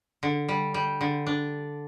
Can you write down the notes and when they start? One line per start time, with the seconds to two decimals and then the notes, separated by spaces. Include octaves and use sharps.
0.23 D3
0.49 G3
0.74 G3
1.01 D3
1.27 D4